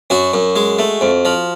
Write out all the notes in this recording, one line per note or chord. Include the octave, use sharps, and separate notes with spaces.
F#2 F#4
F#2
G#3
A3
F2
F3